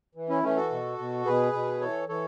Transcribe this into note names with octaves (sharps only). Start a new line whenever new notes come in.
E3
C#4 E4
E3 A3 C#4
F#4 A4
B2
B2
B2 G#4 B4
B2
E3 A4 C#5
E3 A4 C#5